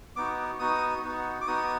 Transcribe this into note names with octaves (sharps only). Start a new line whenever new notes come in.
B3 D#4 F#4 D6
B3 D#4 F#4 D#6
B3 D#4 F#4
D6
B3 D#4 F#4 D#6